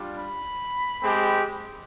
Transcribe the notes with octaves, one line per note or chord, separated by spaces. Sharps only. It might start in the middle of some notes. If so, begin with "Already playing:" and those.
Already playing: G3 D4 F4
B5
G#3 C4 G4